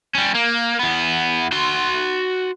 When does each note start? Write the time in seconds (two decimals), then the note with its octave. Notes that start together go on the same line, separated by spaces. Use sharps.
0.15 G3 C#4
0.35 A#3
0.79 E2 B3
1.52 F#4 C6